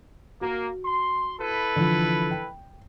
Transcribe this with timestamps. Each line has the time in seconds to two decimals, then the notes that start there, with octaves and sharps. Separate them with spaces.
0.41 A#3 F#4
0.85 C6
1.40 E4 A4 B4
1.76 D3 E3 F3
2.31 G5